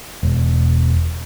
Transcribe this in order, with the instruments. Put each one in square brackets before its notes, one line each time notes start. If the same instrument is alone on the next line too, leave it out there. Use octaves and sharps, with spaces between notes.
[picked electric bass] E1